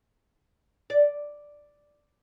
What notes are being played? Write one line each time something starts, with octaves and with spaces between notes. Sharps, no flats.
D5